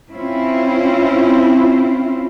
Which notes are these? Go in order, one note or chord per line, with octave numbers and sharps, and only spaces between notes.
C4 C#4 E4 F4